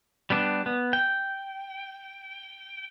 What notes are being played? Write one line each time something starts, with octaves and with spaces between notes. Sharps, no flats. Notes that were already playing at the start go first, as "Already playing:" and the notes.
G3 B3 D4
B3
G5